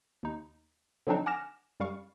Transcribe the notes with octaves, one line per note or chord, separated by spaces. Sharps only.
D#2 D#4
D3 F3 F#3 C4 D4 D#4
F#5 G#5 D6 F6 A#6 E7
F#2 G3 F5 C#6